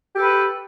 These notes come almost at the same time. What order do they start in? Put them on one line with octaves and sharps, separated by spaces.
G4 A4 B4